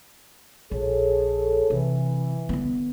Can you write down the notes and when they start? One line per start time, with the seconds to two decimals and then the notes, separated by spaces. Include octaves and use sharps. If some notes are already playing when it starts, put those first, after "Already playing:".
0.71 A#1 G#4 A4 C#5
1.70 C3 E3
2.49 D3 B3